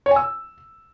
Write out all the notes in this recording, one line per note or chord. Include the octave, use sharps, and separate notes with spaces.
C#5
G#5
E6